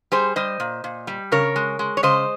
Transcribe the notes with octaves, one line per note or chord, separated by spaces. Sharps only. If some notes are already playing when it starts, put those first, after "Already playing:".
G3 G#4 C5
G3 C5 D#5
A#2
A#2
G3
C#3 A#4 C#5
G#3
G#3
C#5
C#3 C5 D#5